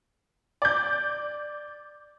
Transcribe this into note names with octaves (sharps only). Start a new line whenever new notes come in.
D5 G6